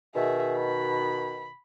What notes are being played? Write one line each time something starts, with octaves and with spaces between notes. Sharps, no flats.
B2 D#3 G#4 E5
B5